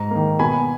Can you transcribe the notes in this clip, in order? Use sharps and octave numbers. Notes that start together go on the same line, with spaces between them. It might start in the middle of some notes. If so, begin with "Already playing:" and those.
Already playing: G#2 A#5
D#3 A#3
B2 G#5 B5